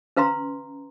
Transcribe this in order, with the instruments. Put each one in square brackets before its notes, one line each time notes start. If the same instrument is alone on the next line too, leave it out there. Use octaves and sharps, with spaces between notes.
[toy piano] C#4 B4 F5 A#5 C6